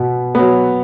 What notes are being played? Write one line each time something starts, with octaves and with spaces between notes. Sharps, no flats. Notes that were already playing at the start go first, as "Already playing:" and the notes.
Already playing: B2 B3
F#3 B3